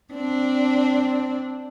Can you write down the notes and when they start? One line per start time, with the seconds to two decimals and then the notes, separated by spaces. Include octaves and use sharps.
0.13 C4 D4